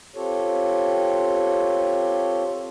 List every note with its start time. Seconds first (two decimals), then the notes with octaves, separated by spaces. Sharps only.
0.15 C4 F4 G4 A4 C#5